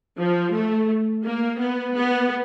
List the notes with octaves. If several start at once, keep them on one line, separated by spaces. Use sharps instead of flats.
F3
A3
A#3
B3
B3